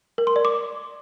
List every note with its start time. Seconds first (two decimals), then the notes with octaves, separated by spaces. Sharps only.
0.18 A#4
0.27 C6
0.36 D5
0.45 D6